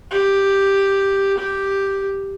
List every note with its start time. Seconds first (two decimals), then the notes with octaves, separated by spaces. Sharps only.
0.11 G4
1.38 G4